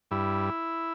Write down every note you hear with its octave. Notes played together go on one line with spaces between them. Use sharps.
G2 E4